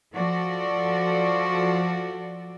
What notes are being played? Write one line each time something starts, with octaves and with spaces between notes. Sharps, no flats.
F3 F#4 A4 D5